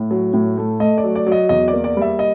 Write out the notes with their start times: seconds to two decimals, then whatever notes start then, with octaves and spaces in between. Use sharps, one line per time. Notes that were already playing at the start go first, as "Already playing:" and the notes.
Already playing: A2
0.11 F#3
0.33 A2
0.58 A3
0.80 A3 D#5
0.98 D5
1.04 F#3
1.15 D5
1.27 F#3
1.32 D#5
1.49 E2 D#5
1.68 D5
1.73 A#3
1.84 D5
1.97 G3 E5
2.19 D#5